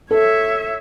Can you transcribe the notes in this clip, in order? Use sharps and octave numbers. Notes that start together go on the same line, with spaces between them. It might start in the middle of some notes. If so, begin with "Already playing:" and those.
A4 C#5 E5